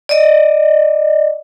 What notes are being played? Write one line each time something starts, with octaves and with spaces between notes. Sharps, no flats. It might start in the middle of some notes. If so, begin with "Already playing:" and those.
D5 D#5